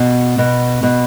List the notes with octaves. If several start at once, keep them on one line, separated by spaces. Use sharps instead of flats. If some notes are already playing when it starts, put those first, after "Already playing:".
Already playing: B2
B2
B2